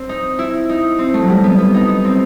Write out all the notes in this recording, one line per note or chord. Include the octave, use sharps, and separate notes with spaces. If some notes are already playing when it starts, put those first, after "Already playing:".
Already playing: C4
D#4
E4
D#4
C4
A3
F#3
G3
B3
B3
D#4
D#4
C4